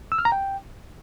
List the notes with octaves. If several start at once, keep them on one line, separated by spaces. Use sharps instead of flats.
E6
F6
A#5
G5